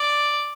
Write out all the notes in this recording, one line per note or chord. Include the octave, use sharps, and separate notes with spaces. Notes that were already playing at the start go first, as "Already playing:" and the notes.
Already playing: D5